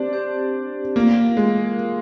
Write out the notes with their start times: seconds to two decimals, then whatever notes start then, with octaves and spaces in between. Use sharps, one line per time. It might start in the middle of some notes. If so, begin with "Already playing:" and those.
Already playing: C4 D4 G4 C5
0.13 C4 G4 C5
0.96 A#3 F4 A#4 F5
1.37 G#3